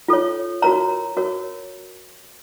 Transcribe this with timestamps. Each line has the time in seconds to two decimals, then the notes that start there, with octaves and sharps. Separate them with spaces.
0.08 F4 A4 C#5
0.62 F#4 A#4 C#5 A#5
1.17 F#4 A#4 C#5